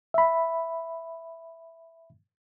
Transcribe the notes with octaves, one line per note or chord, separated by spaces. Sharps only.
E5 B5